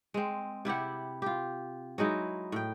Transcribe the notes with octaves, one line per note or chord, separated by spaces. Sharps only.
G#3 C4
C3 E4 G4 F#5
F4 G4
F#3 G#3 D#4 E4
A2 G5